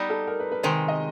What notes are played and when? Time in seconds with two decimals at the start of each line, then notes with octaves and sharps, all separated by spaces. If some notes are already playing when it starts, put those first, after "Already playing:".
Already playing: G3 B3 D#4
0.10 A4
0.27 A#4
0.40 B4
0.52 B4
0.63 C3 D#3 G#3 C5
0.88 D#5